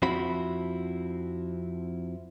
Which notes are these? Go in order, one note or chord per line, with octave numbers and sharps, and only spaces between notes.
F2 F3 C4 E4 F#4 B5